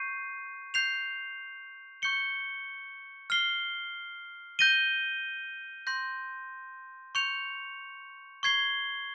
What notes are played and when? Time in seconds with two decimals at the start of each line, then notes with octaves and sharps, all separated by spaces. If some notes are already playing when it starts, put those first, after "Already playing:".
Already playing: C#6 G6 C7 D#7
0.74 G6 C7 F7
2.02 C#6 G6 C#7 G7
3.30 F6 C7 G7
4.59 G6 A#6 D#7 G7
5.87 C6 G6 A#6
7.15 C#6 G6 C#7 F7
8.43 C#6 G#6 C7 G7